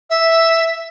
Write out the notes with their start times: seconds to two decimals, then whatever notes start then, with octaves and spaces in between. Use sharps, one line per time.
0.10 E5